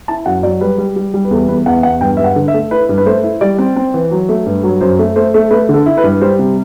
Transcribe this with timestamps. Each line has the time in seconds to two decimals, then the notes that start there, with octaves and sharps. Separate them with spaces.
0.08 E4 A5
0.26 F#2 F#5
0.43 F#3 D5
0.61 G3 B4
0.78 G3
0.96 G3
1.14 G3
1.25 B4
1.31 E2 A4
1.48 E2 B4
1.66 E2 F#5
1.83 E2 F#5
2.01 G2 G5
2.17 G2 E5
2.24 F#5
2.36 D3
2.48 E5
2.54 A3
2.71 E4 B4
2.89 G2
2.98 B4
3.06 A3 C5
3.23 E4
3.41 G3 D5
3.58 C4
3.76 C4
3.94 E3
4.11 F#3
4.29 A3
4.46 G2
4.63 F#3
4.81 F#2 C5
4.99 A3
5.16 A3 C5
5.34 A3
5.51 A3 B4
5.69 D3
5.74 A4
5.86 E4
5.98 B4
6.04 G2
6.21 G3 C5
6.39 C3